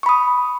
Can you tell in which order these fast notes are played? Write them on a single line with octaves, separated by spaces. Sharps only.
C#6 B5 D#6